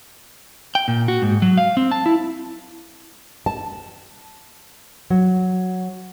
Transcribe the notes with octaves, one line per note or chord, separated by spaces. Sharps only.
G5
A#2
F#4
G#2
F#3
F5
C4
A5
E4
A5
F#3